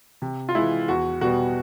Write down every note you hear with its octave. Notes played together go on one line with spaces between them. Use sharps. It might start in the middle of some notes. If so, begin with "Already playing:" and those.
C3
F4
E3 G#3 E4
E2 F#4
B2 G3 B3 F#4